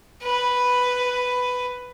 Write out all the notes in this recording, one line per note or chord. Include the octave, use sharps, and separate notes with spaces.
B4